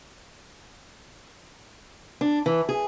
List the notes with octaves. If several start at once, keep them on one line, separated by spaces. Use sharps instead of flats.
D4
E3
G#4